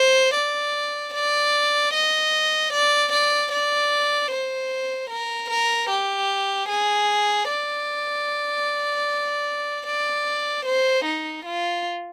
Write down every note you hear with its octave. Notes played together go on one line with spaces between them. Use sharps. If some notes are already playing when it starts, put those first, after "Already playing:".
Already playing: C5
D5
D5
D#5
D5
D5
D5
C5
A#4
A#4
G4
G#4
D5
D5
C5
D#4
F4